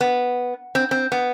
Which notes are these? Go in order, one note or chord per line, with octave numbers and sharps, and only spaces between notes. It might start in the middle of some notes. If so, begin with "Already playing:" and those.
B3
C4
C4
B3